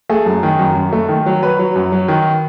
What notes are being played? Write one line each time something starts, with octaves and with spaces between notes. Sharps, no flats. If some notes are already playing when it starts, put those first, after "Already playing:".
A3 G#4
F#2
D#3
F#2
F#2
A3
D#3
F#3
F#3 B4
F#3
F#2
F#3
D#3